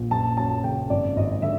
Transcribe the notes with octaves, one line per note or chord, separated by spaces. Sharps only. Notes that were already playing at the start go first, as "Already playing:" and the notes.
Already playing: A#1
F#1 A5
F#2 A5
C#3 G5
G#1 D5
G#1 D#5
D3 E5